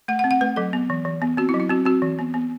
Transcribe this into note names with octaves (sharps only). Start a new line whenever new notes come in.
A3 F#5
F#5
C4
F#5
A3 B4
F#3 A4
B3
E3
E3
B3
C4 F#4
E4
F#3
E4
C4 F#4
C4 F#4
E3
B3
B3